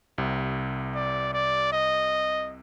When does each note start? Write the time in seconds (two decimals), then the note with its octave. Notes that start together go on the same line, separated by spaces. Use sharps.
0.18 C2 C3
0.95 D5
1.33 D5
1.73 D#5